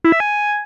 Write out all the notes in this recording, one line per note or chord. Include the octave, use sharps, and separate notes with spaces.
E4
E5
G#5